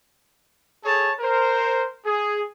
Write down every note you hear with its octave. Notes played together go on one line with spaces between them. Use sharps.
G#4 A4 C#5 A5
A#4 C5
G#4